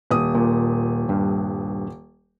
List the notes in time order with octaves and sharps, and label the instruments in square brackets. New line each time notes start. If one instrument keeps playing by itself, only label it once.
[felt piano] D#1 D#6
[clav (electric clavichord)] A#2
G2